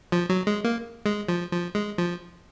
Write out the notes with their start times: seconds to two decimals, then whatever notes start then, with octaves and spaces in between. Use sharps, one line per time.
0.12 F3
0.30 F#3
0.47 G#3
0.64 A#3
1.06 G#3
1.29 F3
1.52 F3
1.75 G#3
1.98 F3